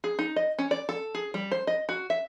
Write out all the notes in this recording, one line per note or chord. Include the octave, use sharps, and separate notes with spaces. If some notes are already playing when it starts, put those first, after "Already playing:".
G#4
D#4
D#5
C#4
D5
A4
G#4
G3
C5
D#5
F#4
E5